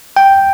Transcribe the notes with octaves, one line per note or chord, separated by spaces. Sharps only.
G5